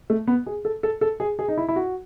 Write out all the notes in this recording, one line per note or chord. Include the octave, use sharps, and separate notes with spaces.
A3
B3
G#4
A4
A4
A4
G#4
G#4
D#4
E4
E4
F#4